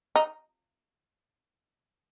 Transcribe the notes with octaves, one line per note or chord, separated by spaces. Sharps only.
D#4